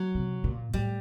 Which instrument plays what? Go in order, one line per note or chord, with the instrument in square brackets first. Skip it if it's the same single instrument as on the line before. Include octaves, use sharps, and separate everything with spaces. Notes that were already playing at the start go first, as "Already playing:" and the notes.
Already playing: [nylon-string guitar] F#3
[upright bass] C3
A#2
[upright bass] A2 [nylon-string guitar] G3